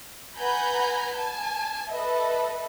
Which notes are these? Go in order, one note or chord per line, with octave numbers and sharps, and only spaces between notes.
B4 F#5 G#5 A#5 B5 G6
G#5 A5
A4 B4 D#5 E5